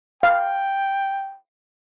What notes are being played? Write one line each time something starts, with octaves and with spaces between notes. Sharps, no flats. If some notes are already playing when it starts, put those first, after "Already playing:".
F5 G5